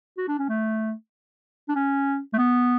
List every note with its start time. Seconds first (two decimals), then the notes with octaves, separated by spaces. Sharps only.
0.17 F#4
0.28 D4
0.39 C#4
0.49 A3
1.69 D4
1.75 C#4
2.33 A3
2.38 B3